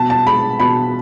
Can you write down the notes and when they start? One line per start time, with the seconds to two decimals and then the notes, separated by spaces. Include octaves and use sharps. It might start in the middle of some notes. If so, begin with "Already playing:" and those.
Already playing: B2 B3 A5
0.10 A5
0.27 G#3 B5
0.60 B2 B5